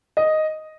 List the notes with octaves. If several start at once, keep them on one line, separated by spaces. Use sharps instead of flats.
D#5